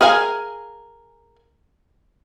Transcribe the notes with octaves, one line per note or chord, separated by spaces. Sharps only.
G#4 A#4 F5 G5 G#5